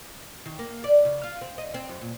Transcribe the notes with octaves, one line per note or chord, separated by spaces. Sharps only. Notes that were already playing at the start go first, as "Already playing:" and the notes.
D#3
A#3
D5
C#3
F4
C4
D#5
C4
F#2
A#2